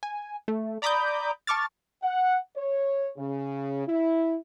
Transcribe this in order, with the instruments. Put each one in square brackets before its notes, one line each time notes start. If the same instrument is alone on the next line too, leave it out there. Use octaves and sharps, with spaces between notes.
[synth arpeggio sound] G#5
A3
D5 A#5 B5 D6 D#6 G6
A5 C#6 D6 F6 A6
[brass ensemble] F#5
C#5
C#3
E4